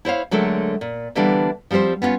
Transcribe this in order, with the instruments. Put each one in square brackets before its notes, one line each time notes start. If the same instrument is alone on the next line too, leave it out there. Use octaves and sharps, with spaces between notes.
[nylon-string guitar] E4 C5 C#5 F5
D3 F#3 G#3 A3 A#4
A#2
D3 E3 G3 A#3 B3 D4
F3 G3 C4 G4 C5
B3 C#4 D4 F4